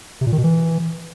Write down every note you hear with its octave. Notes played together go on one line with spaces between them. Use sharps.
C3
A#2
D#3
B2
E3